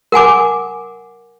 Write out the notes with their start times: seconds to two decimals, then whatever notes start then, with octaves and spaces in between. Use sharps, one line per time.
0.12 A#4 F#5 G#5 D6